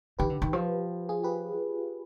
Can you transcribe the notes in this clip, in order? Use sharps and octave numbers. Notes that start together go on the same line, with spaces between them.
D#3 G4 B4
D3
D#3
F3
F4 G#4
G4 B4